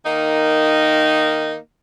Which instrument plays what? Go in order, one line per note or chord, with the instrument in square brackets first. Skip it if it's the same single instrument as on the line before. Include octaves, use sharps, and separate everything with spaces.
[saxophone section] D#3 A#3 D#4